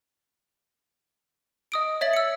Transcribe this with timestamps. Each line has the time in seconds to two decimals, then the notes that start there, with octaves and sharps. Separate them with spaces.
1.72 D#5 D#6 D7
2.01 C#5 E5 A6 F#7
2.13 E6 C#7